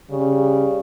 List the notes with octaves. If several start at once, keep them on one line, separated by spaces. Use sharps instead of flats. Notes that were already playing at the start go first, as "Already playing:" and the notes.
C#3 G3